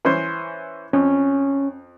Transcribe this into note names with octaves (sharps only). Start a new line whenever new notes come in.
E3 C#4 C5
F2 C#4